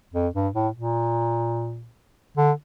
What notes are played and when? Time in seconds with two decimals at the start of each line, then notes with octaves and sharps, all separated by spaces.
0.14 F2
0.34 G2
0.54 A2
0.74 A#2
2.37 D3